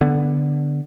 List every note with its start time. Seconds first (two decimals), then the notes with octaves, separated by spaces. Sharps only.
0.01 D3 B3